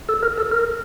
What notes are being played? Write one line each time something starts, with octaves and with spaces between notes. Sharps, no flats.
A4
A#4
A4
A#4